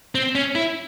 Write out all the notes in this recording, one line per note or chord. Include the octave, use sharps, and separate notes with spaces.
C4
C#4
E4